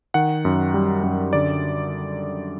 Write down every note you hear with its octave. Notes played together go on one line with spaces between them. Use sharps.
D#3 F#5
F#2
G3
F#2
D3 D5